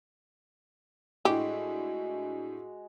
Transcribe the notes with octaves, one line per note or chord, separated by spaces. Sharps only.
A2 G#3 D4 E4 F#4 G4